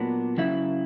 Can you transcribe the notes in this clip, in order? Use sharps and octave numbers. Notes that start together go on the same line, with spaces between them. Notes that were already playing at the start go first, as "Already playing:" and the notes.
Already playing: A#2 F#3 B3 D4
F#2 C#3 E4